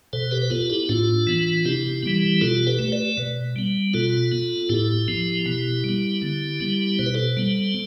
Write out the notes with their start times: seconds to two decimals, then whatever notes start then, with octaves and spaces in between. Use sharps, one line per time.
0.13 B2 A4 C5
0.31 G4 B4
0.42 B4
0.50 B3 F4 A4
0.70 E4 G4
0.89 A2 D4 F4
1.27 E3 B3
1.65 C3 E4 G4
2.03 E3 G3 B3
2.41 B2 F4 A4
2.67 G4 B4
2.79 A3
2.92 B4 D5
3.17 B2
3.56 G3 B3
3.94 B2 F4 A4
4.32 B3
4.69 A2 E4 G4
5.08 F3 B3
5.46 B2
5.84 G3 B3
6.22 D3
6.61 G3 B3
6.99 B2 C5
7.06 B4
7.15 A4 C5
7.37 G3 B3